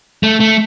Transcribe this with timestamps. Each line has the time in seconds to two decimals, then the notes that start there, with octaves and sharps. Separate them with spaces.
0.23 A3
0.40 A3